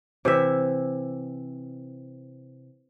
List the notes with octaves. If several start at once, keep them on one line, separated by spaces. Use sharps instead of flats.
C3 E3 E5